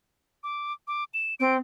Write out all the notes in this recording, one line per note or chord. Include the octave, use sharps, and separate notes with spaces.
D6
D6
E7
C4 D7